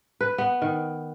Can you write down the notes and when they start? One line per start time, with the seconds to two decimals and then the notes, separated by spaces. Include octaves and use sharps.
0.21 B4
0.38 B3
0.62 D#3